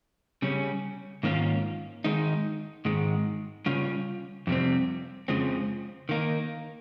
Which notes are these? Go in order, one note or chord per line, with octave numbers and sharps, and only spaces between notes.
C#3 G3 C#4
G#2 D#3 A#3 C#4 F4
D#3 G#3 D#4
G#2 D#3 G#3
C#3 G3 C#4 F4
F2 C3 G3 C4
F2 C#3 F3 G#3 C4
D#3 A#3 D#4